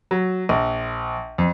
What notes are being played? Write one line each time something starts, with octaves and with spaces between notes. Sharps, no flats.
F#3
A#1
F2